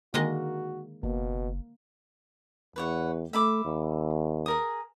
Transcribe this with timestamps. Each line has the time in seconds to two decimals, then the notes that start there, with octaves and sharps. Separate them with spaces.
0.14 D3 D#3 G#3 A#3 F#4 D#5
1.03 F#1 B2 A#3
2.76 E2 B4 C#5 F#5
3.33 A3 E5 B5 D6
3.65 D#2
4.46 G#4 A#4 D#6